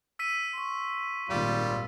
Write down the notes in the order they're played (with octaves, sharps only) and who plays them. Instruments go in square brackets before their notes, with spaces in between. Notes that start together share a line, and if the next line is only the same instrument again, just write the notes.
[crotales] E6 B6 D#7
[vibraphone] C6 C#6
[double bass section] G#1 A#2 [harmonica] G3 F4